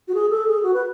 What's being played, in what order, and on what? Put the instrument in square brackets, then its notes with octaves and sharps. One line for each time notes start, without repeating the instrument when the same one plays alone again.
[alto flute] F#4
G#4
A4
G#4
F#4
B4